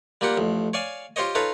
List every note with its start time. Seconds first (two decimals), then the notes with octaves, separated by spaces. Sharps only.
0.21 G3 A#3 F4 G4 F#5
0.37 A1 F2
0.73 C#5 D5 F5 G#5
1.16 F4 G4 C5 C#5 D#5
1.35 D#4 F4 A4 B4 C#5 F5